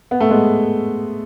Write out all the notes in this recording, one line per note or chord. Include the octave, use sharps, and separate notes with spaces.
B3
A3
G#3 B3